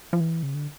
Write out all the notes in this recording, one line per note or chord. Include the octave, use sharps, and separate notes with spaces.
F3
E3
C#3
D3